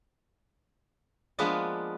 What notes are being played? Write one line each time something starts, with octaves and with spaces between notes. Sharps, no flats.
F3 G#3 A#3 B3 D4 B4